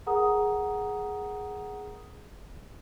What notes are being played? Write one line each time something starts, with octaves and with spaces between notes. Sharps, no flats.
G#4 A#4 F#5 A#5 D#6